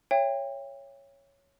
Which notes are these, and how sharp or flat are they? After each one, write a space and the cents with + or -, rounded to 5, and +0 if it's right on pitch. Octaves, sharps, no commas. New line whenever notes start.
C#5 +0 E5 +35 G5 +30